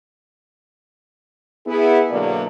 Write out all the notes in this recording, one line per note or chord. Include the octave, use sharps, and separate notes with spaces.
B3 E4 G#4
B2 D3 F#3 A#3 D5